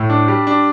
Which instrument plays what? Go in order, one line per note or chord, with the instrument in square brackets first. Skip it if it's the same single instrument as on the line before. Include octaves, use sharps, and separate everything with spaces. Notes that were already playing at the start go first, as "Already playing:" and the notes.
Already playing: [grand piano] A2
D4
G3
D4